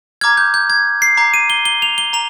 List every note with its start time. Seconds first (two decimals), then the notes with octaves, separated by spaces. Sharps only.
0.21 A#5 D6 F6 G#6
0.37 G6
0.54 G6
0.70 G#6
1.02 C7
1.17 A#5 D6 G6
1.34 D#7
1.50 G7
1.65 G7
1.82 F7
1.98 G7
2.13 A#5 F7